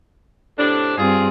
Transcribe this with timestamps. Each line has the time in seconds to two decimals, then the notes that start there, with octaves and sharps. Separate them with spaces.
0.58 A2 C3 D4
0.98 G2 C4 F4 G#4